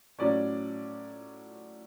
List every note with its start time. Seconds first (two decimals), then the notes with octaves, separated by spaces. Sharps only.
0.19 A2 F#3 C#4 D5